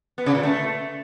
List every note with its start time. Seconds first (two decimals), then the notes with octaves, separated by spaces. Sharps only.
0.18 B3
0.26 C#3
0.35 A#2
0.43 A3